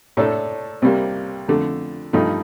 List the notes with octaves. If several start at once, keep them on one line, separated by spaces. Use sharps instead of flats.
A2 A3 D4 A4
C2 C3 G3 A#3
F2 D3 A3
G2 F3 A3 D#4